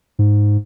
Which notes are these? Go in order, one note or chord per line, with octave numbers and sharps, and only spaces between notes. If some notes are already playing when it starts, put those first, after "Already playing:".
G#2